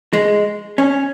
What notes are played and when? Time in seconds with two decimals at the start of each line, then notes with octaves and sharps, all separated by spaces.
0.13 G#3
0.78 C#4